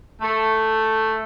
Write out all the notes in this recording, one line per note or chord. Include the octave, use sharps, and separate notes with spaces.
A3